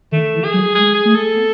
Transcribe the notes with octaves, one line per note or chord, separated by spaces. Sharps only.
D#3 A3
E3
G#4
F#3
G#3 G#4
G#4
A3
A4
B3